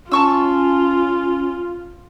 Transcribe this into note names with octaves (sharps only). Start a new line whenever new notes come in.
C#4 F4 A5 C#6 E6